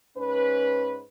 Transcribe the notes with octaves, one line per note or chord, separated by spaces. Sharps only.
G#2 C#4 B4